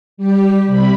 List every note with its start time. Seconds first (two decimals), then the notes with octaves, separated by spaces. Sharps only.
0.17 G3 G4
0.66 C3 G3 B5